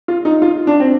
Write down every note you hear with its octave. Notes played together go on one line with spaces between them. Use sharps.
F4
D#4
F4
D4
C4